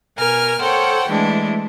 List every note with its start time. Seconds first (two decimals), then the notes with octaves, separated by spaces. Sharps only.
0.17 B2 A#4 G#5 F6
0.61 A4 C5 C#5 F#5 G5
1.08 E3 G#3 A3 D4